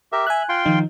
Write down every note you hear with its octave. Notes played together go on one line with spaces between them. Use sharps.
G4 A#4 E5
E5 G#5 F#6
F4 G5 C6
D#3 F3 D#4